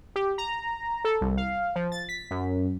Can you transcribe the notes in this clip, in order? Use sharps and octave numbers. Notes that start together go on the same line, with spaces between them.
G4
A#5
A4
C2
F5
F3
A6
B6
F#2